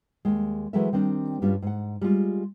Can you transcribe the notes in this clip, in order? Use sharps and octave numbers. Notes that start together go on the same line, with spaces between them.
D#2 G#3
E3 F#3 G#3 A3 A#4 E5
D#3 G3 C4 D4
G2 G3 C#4 D4 F4
G#2 F#5
G3 G#3 F4